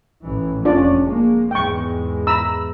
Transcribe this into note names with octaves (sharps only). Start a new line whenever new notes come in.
A1 E3
F1 C#4 D4 F4 D5
G#3 A#3
E2 G#2 G#3 G5 C#6
A#5 B5 E6